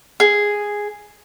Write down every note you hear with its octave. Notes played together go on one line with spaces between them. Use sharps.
G#4